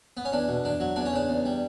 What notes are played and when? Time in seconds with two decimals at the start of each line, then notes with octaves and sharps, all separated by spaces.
0.17 B3
0.25 C#4
0.32 E2 D4
0.48 B2
0.64 E2 D4
0.80 F#3
0.96 E2 D4
1.06 C#4
1.13 C#3 D4
1.29 E2
1.45 G3